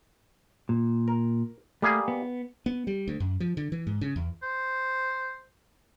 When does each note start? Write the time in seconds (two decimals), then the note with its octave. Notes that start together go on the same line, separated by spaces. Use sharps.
0.69 A#2
1.08 A#4
1.82 G3 A3 A#3 G#4
2.08 B3
2.66 B3
2.87 G3
3.08 D2
3.20 F#2
3.40 F3
3.57 D3
3.72 E3
3.87 G#2
4.01 C#3
4.16 E2
4.43 C5